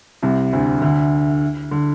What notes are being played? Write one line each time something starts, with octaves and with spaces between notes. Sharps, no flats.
C2 C3
D2 D3
D2 D3
D3